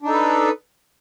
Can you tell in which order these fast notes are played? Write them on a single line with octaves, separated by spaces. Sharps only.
D4 D#4 A4 B4